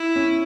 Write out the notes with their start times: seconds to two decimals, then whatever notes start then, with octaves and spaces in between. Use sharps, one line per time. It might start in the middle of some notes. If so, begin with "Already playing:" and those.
Already playing: E4
0.16 C#4